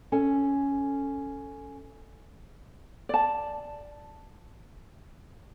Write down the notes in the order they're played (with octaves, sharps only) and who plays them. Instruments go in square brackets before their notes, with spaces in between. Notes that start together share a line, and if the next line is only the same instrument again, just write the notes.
[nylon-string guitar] C#4 A4 G#5
[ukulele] D5 A5